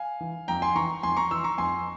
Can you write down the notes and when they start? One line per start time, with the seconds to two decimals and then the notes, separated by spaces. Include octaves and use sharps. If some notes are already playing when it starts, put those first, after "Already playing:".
Already playing: F5 G#5
0.21 E3
0.48 F2 G5 A#5
0.62 G#5 C6
0.75 E3 A#5 C#6
1.03 F2 G#5 C6
1.17 A#5 C#6
1.31 E3 C6 E6
1.44 A#5 C#6
1.58 F2 G#5 C6